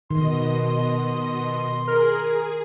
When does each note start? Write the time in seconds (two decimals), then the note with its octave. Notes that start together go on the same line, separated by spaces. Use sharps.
0.11 B2 D#3 D#5 C6
1.87 G#4 A#4